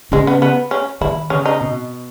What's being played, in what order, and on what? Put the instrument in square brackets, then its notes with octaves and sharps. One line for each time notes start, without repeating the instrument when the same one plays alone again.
[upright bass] C#3 [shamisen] G#3
[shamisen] B3
B3
C#4
[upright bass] D#3 [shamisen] E4
[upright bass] C#3 [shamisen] C#4
[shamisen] D#4
[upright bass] B2